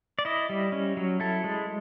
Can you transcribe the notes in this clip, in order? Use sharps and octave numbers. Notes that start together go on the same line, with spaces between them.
D5
E4 D#5
G3
C#4
F#3
E4 A4
G#3